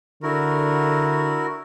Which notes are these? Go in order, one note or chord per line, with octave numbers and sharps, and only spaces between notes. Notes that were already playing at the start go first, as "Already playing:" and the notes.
D3 E4 F#4 A#4